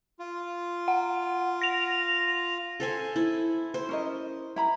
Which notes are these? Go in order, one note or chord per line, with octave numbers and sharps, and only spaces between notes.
F4
F#5
A#6 F7
A4 C5 G#5
E4
C5
C#4 A#4 D#5
E4 A#5 B5